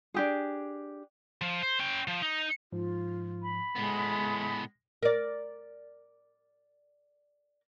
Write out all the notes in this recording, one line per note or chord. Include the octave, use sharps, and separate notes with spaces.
D4 G4 G#4
F3
C5
C#4 G5
F3
D#4
G#2 F3 F4
B5
A2 G#3 B3 A#6
A#4 D5